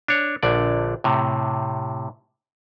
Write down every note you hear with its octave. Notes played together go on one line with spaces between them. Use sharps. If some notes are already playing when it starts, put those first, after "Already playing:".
D4 C#5
A#1 D3 D5
A2 C3